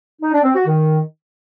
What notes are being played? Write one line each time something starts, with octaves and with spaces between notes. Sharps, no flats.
D#4
D4
C4
F#4
D#3